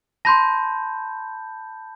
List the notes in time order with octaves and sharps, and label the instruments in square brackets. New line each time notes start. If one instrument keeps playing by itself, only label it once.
[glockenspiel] A5 B5 G6 [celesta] C6 A#6